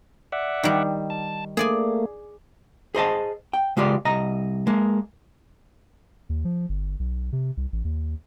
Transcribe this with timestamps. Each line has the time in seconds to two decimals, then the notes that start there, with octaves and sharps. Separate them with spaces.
0.32 D5 E5 F#5
0.63 D#3 G3
1.10 A5
1.57 A3 A#3 G#4 D5 G#5
2.95 G#4 C5 D#5 A5
3.53 G5
3.77 C#3 G#3 F4 G4 D5
4.05 C2 D#5 A#5
4.67 G#3 A#3
6.29 D#2
6.45 F3
6.69 G1
6.99 B1
7.32 C3
7.57 C2
7.72 A1
7.85 D#2